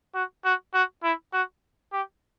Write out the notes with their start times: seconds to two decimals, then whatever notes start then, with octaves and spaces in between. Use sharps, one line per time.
0.14 F#4
0.45 F#4
0.74 F#4
1.03 E4
1.33 F#4
1.92 G4